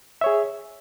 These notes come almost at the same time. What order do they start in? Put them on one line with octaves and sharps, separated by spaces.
E5 C#5 G#4